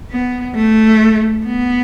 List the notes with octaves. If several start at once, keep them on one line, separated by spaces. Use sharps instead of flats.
B3
A3
B3